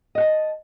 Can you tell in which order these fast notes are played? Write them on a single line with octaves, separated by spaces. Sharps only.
D#5 F#5 A5